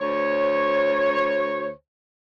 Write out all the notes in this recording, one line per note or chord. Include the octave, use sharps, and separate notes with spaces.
D2 C5 C#5